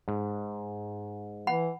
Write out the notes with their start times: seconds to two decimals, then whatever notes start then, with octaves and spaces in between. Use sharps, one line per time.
0.08 G#2
1.47 E3 F#5 B5